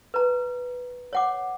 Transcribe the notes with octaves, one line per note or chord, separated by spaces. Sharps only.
B4 A#5
C#5 F#5 D6